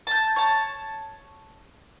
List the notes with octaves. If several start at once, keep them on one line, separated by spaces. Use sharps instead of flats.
A5 G6
C#5 A5